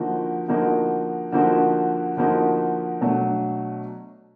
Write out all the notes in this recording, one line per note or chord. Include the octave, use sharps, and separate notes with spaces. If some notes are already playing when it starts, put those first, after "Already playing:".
Already playing: D3 F3 A#3 D#4 F#4
D3 F3 A#3 D#4 F#4
D3 F3 A#3 D#4 F#4
D3 F3 A#3 D#4 F#4
B2 F#3 A3 D4